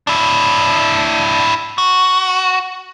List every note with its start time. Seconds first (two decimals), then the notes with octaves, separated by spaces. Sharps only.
0.07 D4 E4
1.78 F#4